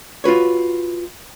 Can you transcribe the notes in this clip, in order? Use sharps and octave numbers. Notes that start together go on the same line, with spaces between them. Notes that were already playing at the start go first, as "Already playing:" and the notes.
F4 F#4 B4 C#5